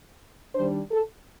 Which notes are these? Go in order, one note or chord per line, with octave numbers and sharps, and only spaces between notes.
D#3 G3 D4 C5
A4